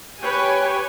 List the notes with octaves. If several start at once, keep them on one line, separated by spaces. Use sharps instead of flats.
G4 B4 C#5 G5 G#5